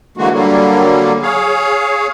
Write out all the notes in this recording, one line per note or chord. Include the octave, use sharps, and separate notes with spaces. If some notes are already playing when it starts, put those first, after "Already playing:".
D3 E3 G#3 A#3 F#4
D3 F#3 G3 A#3
G#4 C#5 F5